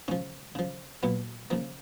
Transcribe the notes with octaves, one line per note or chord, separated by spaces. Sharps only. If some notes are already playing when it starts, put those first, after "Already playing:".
C#3 F3 C#4
C#3 F3
A#2 F#3 B3
C#3 F3 A#3